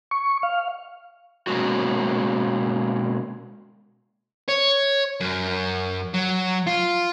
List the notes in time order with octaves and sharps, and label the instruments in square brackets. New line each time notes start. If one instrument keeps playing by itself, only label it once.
[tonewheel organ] C#6
F5
[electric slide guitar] B2 G#3 A#3 C#4 F#4
[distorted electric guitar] C#5
F#2
F#3
F4